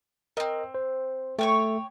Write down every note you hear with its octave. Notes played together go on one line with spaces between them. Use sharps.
A3 C4 A#4 D#5
C5
A3 G4 C#5 C#6